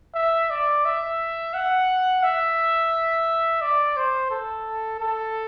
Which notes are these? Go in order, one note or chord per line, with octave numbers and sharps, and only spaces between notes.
E5
D5
E5
F#5
E5
D5
C5
A4
A4